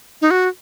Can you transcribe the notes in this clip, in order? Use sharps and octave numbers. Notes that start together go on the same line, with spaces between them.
D#4
F#4